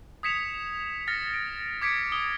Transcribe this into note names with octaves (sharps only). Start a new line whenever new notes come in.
D#6 G#6 B6 C#7 E7 F7
F6 A6 A#6 C#7
D7
D6 G#6 B6 C#7 D7
D#6 G7